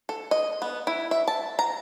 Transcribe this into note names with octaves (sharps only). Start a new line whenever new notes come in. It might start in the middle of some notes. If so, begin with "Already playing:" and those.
A4
D#5
B3
E4
E5
A5
A#5